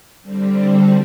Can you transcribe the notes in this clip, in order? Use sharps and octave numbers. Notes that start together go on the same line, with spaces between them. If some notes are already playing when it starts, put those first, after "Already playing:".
D3 G3 C4
D4 F#4